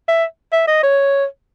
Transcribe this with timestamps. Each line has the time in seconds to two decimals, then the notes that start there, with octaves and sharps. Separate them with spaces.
0.09 E5
0.53 E5
0.68 D#5
0.83 C#5